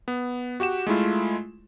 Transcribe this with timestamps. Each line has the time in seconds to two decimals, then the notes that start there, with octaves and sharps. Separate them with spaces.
0.08 B3
0.60 F#4 G4 F#5 E7
0.87 G#3 A3 E4 F4